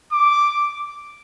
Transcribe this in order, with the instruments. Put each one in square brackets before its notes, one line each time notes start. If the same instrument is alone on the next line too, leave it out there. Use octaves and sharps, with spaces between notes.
[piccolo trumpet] D6